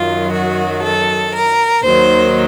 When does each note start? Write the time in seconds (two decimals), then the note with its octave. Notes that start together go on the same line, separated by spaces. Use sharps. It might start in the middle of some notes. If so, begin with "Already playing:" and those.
Already playing: F#2 D#3 F#3 F4
0.32 F#4
0.83 A4
1.34 A#4
1.84 D#2 D#3 F#3 C5